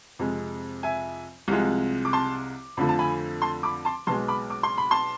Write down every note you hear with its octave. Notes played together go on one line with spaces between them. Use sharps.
F2 C3 G#3
E5 G#5
C2 C3 F3 G#3
D6
A5 C6
F2 D3 F3 A3 B5
A5
G#5 B5
A5 C6
B5 D6
A5 C6
B1 B2 G#3 A5 C6
B5 D6
D6
C6
B5
A5 C6